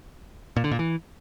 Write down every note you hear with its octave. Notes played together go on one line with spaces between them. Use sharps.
A#2
D3
A#2
E3